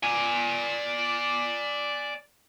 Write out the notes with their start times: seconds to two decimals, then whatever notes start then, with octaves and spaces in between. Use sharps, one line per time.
0.03 D5 G#5